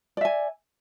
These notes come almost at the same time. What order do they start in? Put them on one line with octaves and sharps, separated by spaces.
D5 E5 G#5